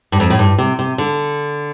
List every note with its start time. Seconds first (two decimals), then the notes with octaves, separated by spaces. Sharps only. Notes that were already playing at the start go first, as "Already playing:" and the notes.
0.12 G2
0.20 F2
0.30 A2
0.39 G2
0.58 C3
0.79 C3
0.98 D3